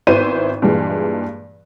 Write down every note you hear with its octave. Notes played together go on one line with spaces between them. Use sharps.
G#1 B3 E4 C5 D#7
G2 A#2 E3 G#3